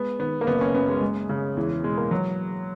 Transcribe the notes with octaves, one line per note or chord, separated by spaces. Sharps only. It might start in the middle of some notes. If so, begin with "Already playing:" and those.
Already playing: G#3 B3
D#3 B3
A#3
F#1 B3
C#4
F#2 B3
G#3
G#3
C#3 G#3
E2 E3
B2 G#3
A#3
E3 F#3